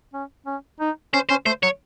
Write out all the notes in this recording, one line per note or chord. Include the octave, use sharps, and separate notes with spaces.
C#4
C#4
D#4
C#4 C5
C#4 C5
A3 C5
F#3 C#5